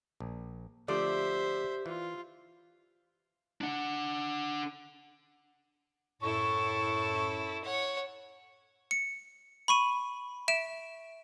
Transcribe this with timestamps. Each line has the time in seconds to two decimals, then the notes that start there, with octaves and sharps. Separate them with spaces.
0.20 A#1
0.88 D3 F3 A3 G4 C5 D5 E5
1.86 E3 F4
3.61 D4 F#5
6.22 F#2 A2 E4 A4 C#6
7.64 C#5 F#5
8.91 C#7
9.68 B5 C#6 D#7
10.48 E5 D7 E7